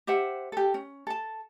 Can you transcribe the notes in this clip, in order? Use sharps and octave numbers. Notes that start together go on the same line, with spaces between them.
G4 C5 E5 F#5
G4 A4
C#4
A4 A5